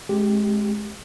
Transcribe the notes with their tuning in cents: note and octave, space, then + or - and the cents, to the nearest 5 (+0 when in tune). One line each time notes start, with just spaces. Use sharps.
G#3 +20 C4 +45 G4 +0